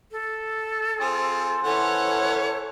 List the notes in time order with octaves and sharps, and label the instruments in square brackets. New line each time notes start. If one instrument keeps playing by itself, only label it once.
[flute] A4
[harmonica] C4 F4 G#4 [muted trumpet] C5
[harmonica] E3 C#4 F#5 [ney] A4 [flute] C#5